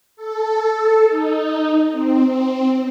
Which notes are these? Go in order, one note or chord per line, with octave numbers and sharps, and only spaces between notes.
A4
D#4
C4
C4